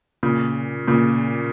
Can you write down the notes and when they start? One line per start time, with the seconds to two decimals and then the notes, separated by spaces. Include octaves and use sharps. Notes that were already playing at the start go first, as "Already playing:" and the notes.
0.23 A#2 C#3
0.88 A#2 C#3